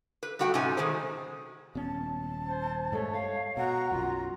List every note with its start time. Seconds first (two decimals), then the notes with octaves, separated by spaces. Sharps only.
0.23 B4
0.39 G3 A3 F#4 F#5 G5
0.54 G#2 C3 C#4 D#4 G#5
0.77 B2 D#3 G#3 G#4 C5
1.75 D#1 B3 C#4 A5
2.46 C5
2.92 G2 G#3 A3 A4 C#5
3.13 F5
3.57 B2 F#4 F#5 A#5
3.91 B1 F#2 F4